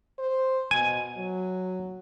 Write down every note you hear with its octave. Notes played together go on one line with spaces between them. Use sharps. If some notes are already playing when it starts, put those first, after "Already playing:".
C5
B2 G#5
F#3